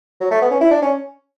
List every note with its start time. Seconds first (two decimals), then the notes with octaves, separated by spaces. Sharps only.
0.21 F#3
0.31 A3
0.42 B3
0.51 C#4
0.61 E4
0.71 D4
0.82 C#4